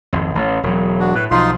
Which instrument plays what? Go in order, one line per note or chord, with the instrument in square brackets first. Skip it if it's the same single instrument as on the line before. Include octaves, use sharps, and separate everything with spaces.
[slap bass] G#1 F2
A1
E1 F#3
[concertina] D4 F#4
[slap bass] A2 [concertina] B4
[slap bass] B1 F3 [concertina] D#4 F4 C6